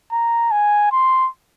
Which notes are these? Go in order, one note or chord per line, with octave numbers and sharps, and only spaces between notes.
A#5
G#5
C6